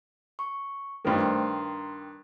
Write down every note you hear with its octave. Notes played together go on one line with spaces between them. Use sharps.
C#6
G2 D#3 A3 C5
A#5 C6